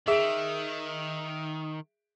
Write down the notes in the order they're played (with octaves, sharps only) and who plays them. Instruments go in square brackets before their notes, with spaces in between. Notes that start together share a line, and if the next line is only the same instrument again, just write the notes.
[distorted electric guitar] D#3 [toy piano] G#4 A#4 [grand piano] E5 D7